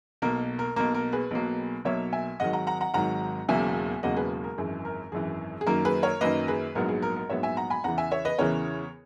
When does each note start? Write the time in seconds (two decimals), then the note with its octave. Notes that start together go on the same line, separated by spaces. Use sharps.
0.22 B1 B2 A#3 A#4
0.59 A#4
0.76 B1 B2 A#3 A#4
0.95 A#4
1.12 G#4 B4
1.31 B1 B2 F#3 A#3
1.85 B1 B2 F#3 A#3 C#5 E5
2.12 E5 G#5
2.40 G#1 G#2 D#3 F#3 D#5 F#5
2.53 F#5 A#5
2.67 F#5 A#5
2.81 F#5 A#5
2.94 G#1 G#2 D#3 F#3 F#5 A#5
3.48 E1 E2 C#3 F#3 A#3 E5 G#5
4.03 E1 E2 C#3 F#3 A#3 D#5 F#5
4.17 G#4 B4
4.44 A#4
4.58 G#1 F#2 E3 G#4
4.85 A#4
5.12 G#1 F#2 E3 G#4
5.61 G#4
5.66 F#2 D#3 F#3 A#3 A#4
5.85 G#4 B4
6.03 A#4 C#5
6.21 F#2 D#3 F#3 A#3 B4 D#5
6.48 G#4 B4
6.75 A#1 G#2 F#3 B3 A#4
6.88 G#4
7.02 A#4
7.16 A#4
7.30 A#1 G#2 F#3 B3 C#5 E5
7.43 E5 G#5
7.57 F#5 A#5
7.70 G#5 B5
7.84 E2 C#3 E3 F#5 A#5
7.98 E5 G#5
8.11 C#5 E5
8.25 B4 D#5
8.39 E2 C#3 E3 A#4 C#5